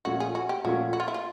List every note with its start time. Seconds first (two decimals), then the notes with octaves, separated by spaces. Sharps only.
0.05 A#2 F3 A3 C#4 F#4
0.20 G#4
0.35 F#4
0.49 G4
0.64 A#2 F3 A3 C#4 F#4
0.93 F#4
1.00 F4
1.08 E4
1.14 F4